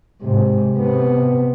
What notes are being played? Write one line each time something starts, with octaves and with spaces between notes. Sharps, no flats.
G#2 C3
C3 B3